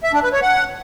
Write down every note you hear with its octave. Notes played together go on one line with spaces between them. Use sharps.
E5
D4
B4
C#5
F#5